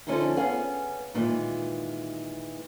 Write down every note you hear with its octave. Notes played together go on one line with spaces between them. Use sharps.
D3 F3 C#4 D#4 E4 G#4
B3 C#4 G#4 F5
A#2 D#3 E3 G#3